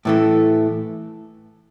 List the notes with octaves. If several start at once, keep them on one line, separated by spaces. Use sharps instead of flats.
A2 E3 A3